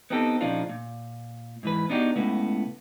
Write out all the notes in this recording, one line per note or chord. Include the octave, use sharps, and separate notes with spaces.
B3 C4 D#4 G4 A4
A#2 C#3 F3 D4 D#4 F4
A#2
G#2 E3 B4
B3 D4 D#4 F#4 G4
C#2 A2 B3